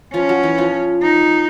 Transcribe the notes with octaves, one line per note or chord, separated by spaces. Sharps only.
F3 C#4 F4
F#3 F#4
E3 E4
F3 F4
D#4